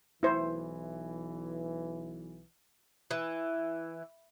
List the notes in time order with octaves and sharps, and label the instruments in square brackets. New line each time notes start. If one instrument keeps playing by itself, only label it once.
[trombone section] B1 E3 [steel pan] E4 C5
[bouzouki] E3